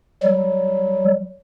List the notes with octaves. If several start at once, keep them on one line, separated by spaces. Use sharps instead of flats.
F#3 G3